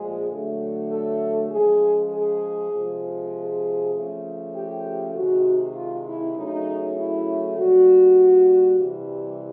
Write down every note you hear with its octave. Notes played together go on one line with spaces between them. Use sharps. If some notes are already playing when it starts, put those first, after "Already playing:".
Already playing: A#2 F3 G#3 G#4
D3 F#3 A3
A4
C#3 F3 G#3 G#4
G#4
C3 F3 G#3
G#4
C#3 F3 A3
G4
C3 D#3 G#3 F#4
F4
E4
C#3 F#3 A3 D#4
E4
A#2 G3 F#4
C3 E3 G3